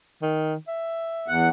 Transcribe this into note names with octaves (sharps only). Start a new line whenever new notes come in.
D#3
E5
E2 F#5